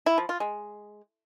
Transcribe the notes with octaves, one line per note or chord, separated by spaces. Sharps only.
E4
F3
F4
G#3